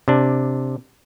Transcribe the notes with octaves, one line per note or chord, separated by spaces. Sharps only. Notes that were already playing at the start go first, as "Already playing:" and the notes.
C3 D4